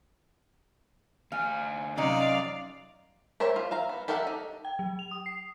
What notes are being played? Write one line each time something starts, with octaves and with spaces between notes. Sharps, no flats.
D2 F5 G#5
C3 F#3 C#4 D#4 D5 F5
G4 A#4 C5 C#5 E5
F4
E5 F5 A#5
B3
G4 A4 A#4 E5 F#5
D#4
G5
F#3
F7
D#6
C7